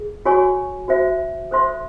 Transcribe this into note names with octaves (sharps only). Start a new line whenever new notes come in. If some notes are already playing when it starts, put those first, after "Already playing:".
Already playing: G#4
F#4 C#5 G#5 C#6
F#4 C5 E5
A4 C5 E5 C6